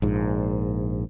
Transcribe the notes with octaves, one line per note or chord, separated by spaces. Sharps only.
A#1 G#2